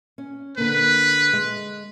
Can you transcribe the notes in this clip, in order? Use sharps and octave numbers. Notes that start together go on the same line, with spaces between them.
C#4
D3 A#3 B4
G#3